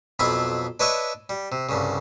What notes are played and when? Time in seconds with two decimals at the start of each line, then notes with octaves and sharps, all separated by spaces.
0.19 B1 F2 E4 F4 E5 B5
0.80 D4 B4 C#5 D#5 E5 C#6
1.29 G3
1.52 C3
1.69 C2 G2 C#3